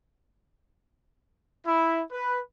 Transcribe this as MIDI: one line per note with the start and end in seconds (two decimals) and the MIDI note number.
1.66 2.01 64
2.11 2.39 71